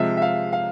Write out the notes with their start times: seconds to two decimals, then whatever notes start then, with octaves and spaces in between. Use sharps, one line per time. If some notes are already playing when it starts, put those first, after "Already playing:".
Already playing: C3 F3 G#3 E5
0.17 E5
0.22 F5
0.53 F5